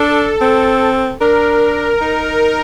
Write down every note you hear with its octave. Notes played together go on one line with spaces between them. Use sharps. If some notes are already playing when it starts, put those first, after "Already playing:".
Already playing: D4 A4
C4
D4 A#4
D#4